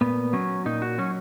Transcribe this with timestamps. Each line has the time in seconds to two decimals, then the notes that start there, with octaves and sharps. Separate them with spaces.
0.01 A#2 B3
0.33 F#3 C#4
0.66 A#2 D#4
0.82 F#4
0.98 F#3 C#4